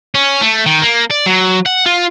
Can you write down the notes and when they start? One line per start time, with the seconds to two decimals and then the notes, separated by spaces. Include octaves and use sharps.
0.15 C#4
0.41 A3
0.66 D#3
0.82 A#3
1.11 D5
1.26 F#3
1.66 F#5
1.86 F4